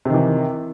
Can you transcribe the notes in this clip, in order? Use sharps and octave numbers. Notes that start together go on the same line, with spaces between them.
C3 D#3 E3